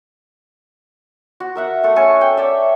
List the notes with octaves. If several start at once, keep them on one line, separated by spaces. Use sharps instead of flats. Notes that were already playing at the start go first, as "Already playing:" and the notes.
F#4
A#4 E5 F#5
A3 A4 F#5
C#4 A4 G#5 C#6
G5
C#5 D5 E5